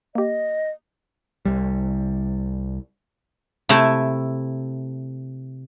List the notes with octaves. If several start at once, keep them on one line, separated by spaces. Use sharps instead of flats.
A#3 G4 D#5
C2 G3
C3 A3 E4